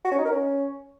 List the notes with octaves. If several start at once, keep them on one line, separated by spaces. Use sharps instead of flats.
F#4
C#4
D#4
A#4
C#4